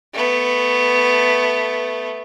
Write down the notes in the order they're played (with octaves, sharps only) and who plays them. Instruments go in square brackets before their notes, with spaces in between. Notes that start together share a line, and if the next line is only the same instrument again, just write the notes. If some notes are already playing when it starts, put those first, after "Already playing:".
[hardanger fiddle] A3 B3